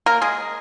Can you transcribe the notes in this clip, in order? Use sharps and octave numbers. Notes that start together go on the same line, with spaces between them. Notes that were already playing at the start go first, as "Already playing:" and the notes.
A#3 A#4
G#3 G#4